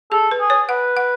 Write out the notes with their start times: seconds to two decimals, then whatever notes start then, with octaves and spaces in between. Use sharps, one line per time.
0.11 G#4 A4
0.31 B4
0.40 G#4
0.50 C#5
0.69 B4 F#5
0.97 F#5